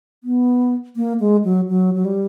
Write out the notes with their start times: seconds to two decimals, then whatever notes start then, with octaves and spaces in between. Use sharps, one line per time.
0.24 B3
0.96 A#3
1.20 G#3
1.44 F#3
1.69 F#3
1.94 F#3
2.05 G3